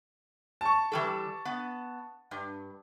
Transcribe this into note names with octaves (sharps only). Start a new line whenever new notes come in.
A5 C#6
E3 G3 A4
B3
G2